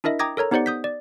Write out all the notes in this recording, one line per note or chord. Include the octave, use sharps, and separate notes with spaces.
D4 E4 A#4 D#5 E5
G5 A#5 D6 D#6 G#6 A#6
A4 A#4 C#5 A#5
B3 D#4 G4 C5 D5 F#5
D#6 G6 B6
D5